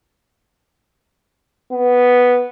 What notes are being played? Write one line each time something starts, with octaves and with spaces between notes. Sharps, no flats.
B3